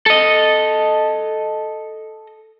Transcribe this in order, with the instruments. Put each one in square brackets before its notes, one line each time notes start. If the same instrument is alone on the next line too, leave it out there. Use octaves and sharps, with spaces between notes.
[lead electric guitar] A4 D#5